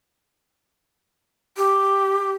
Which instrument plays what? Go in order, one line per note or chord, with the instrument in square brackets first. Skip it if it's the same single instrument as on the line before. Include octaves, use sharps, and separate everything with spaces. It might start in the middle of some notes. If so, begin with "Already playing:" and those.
[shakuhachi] G4